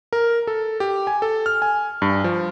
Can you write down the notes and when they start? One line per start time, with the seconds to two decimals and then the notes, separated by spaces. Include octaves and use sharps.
0.13 A#4
0.47 A4
0.80 G4
1.07 G#5
1.22 A4
1.46 F6
1.62 G#5
2.02 G2
2.24 F3